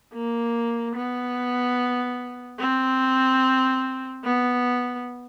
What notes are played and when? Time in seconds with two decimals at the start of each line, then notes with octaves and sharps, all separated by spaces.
0.14 A#3
0.96 B3
2.59 C4
4.24 B3